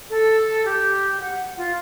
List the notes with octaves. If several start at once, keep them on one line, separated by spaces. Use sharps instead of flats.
A4
G4
F#5
F4